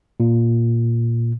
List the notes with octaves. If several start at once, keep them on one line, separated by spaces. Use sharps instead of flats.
A#2